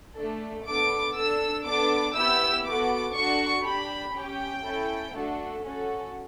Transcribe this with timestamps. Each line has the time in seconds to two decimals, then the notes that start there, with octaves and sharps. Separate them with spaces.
0.16 A3 D4 A4
0.66 B3 D4 A4 D6
1.15 D4 A4 E6
1.65 B3 D4 A4 D6
2.15 B3 E4 G4 E6
2.65 B3 F#4 A4 D6
3.15 D4 F#4 A4 C#6
3.65 D4 G4 B5
4.14 C#4 G4 G5
4.64 C#4 E4 A4
5.14 A3 D4 F#4 A4
5.64 C#4 F#4 A4